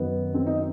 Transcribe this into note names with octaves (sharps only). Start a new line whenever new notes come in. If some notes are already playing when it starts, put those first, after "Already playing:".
Already playing: F#2 D#3 B3
C4
D#4